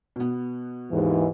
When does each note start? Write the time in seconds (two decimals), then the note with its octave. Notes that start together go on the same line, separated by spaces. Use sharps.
0.16 B2 B3
0.91 D#2 G#2 E3